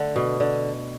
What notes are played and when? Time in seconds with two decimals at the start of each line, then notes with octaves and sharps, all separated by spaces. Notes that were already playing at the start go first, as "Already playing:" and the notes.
Already playing: D3 A3
0.16 B2
0.40 D3